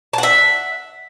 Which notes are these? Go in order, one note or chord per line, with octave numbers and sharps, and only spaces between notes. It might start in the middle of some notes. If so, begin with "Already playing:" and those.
E5 F#5 A5